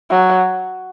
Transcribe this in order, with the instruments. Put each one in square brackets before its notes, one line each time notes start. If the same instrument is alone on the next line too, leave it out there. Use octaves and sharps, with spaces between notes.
[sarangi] F#3